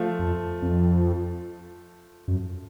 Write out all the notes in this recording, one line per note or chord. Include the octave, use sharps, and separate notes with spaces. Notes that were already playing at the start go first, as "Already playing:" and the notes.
Already playing: F3 A3 F4
F2
F2
F#2